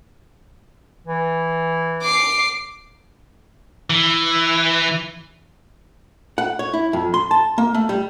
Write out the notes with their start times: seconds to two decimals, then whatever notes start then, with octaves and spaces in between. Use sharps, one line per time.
1.07 E3
2.03 D6 C7
3.90 E3
6.38 F#5
6.59 C#5
6.73 E4
6.93 F2
7.14 C6
7.31 A5
7.58 A#3
7.74 A3
7.89 G3